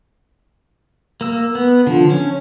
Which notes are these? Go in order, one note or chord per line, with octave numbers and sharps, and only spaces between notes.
A#3 E6
B3
D3 F3
C#4